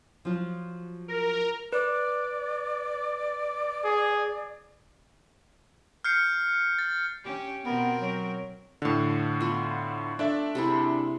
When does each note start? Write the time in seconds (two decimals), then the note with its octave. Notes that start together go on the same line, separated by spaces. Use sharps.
0.25 F3 F#3 F4
1.08 A#4
1.73 B4 D5
3.84 G#4
6.04 F6 G6 C7 C#7
6.79 A6
7.24 C#4 G4
7.65 B2 B3 C4 A#4
8.00 F#3
8.82 A2 D3 F5 A5
9.40 B3 F4
10.19 A3 D4 D5 E5
10.55 C3 G#3 E4